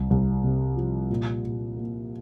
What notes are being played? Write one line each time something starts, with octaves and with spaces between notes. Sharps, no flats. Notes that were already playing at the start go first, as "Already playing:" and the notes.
Already playing: C2
C2
C3
F3
A#2
A#2
A#3